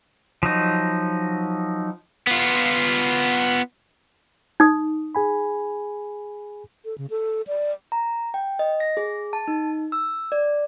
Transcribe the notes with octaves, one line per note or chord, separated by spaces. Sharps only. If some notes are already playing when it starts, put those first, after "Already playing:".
F3 F#3 D#4
B3 F4
D#4 D#6
G#4 G#5 B5
A4
C#3
A4
D5
A#5
G5
D#5
A#6
G#4
A5
D#4
E6
D5